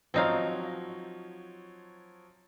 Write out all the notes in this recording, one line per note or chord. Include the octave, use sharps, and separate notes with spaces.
F3 F#3 C4 D#4 C#5 F5